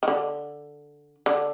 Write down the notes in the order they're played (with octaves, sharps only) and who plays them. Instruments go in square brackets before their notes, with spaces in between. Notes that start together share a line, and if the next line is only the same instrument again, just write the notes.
[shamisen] D#3
D3
D3